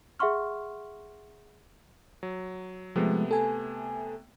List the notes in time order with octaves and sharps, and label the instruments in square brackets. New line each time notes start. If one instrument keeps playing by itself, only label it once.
[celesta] G#4 E5 F#5 C6 C#6 F6
[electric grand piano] F#3
[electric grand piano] C3 A3 B3 [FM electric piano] F3 G#3
[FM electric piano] A4 G#5